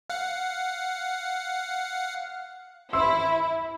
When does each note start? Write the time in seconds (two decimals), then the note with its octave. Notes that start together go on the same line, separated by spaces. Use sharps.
0.10 F5 F#5
2.93 E4 C6 E6